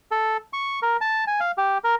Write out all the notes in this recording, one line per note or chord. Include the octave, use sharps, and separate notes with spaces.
A4
C#6
A#4
A5
G#5
F5
G4
A#4